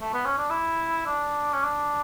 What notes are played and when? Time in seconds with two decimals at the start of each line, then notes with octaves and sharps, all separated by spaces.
0.00 A3
0.14 B3
0.25 C#4
0.38 D4
0.50 E4
1.06 D4
1.53 C#4
1.63 D4